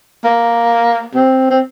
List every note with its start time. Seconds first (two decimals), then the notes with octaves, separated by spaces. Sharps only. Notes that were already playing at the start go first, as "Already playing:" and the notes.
0.25 A#3
1.15 C4
1.51 C4